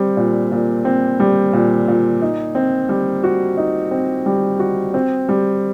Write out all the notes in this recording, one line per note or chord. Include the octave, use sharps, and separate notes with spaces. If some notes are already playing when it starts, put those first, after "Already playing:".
Already playing: G3 C4
A#2
A#2
C4
G3
A#2
A#2
D#4
C4
G3
F#4
D#4
C4
G3
F#4
C4
G3